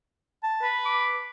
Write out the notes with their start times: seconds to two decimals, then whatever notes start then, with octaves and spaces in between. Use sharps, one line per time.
0.43 A5
0.62 B4
0.86 D6